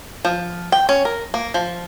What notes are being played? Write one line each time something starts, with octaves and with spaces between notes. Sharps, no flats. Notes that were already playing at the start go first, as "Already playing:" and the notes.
F3
G5
C#4
A#4
A#3
F3